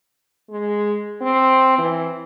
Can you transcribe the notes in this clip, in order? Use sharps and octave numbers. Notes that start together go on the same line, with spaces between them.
G#3
C4
E3